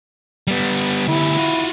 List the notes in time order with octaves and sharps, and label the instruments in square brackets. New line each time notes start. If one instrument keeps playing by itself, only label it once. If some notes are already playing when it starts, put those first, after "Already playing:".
[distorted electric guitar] G3 B3
[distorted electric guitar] D2 G4 [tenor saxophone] E4
[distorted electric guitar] F4 F#4